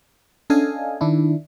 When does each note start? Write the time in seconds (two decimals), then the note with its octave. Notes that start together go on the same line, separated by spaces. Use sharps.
0.50 C#4 D4 A4 D#5 F5 G#5
1.01 D#3 D4 E4